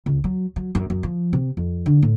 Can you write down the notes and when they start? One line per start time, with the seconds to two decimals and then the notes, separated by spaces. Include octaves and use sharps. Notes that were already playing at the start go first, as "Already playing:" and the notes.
0.06 C#2
0.24 F#3
0.56 F#3
0.75 F#2
0.90 F#2
1.03 F3
1.33 C3
1.57 F2
1.86 D3
2.02 A2